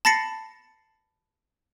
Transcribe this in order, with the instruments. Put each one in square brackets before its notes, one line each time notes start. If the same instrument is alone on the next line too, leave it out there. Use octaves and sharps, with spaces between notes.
[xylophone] A5 B5 A6 A#6 C7 C#7